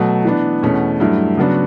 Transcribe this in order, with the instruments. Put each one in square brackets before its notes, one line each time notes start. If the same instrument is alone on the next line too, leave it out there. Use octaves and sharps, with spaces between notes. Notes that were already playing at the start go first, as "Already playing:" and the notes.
Already playing: [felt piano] B2 F#3 A3
E3 B3 D4
E2 B2 A3 C#4
G2 F#3 A3 E4
C#3 F#3 B3 D4 F#4